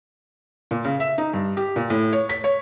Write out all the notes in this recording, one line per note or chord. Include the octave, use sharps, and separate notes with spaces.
A#2
C#3
E5
D#4
G2
G4
A#2
A2
C#5
B6
C#5